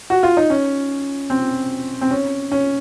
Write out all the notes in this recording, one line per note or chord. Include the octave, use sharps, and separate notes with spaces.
F#4
F4
D#4
C#4
C4
C4
C#4
C#4